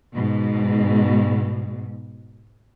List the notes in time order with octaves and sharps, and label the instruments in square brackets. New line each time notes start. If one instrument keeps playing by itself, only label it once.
[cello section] G#2 B2